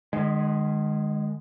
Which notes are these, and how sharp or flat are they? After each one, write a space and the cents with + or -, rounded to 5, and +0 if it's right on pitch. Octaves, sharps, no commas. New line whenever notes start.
D#3 -40 G#3 +0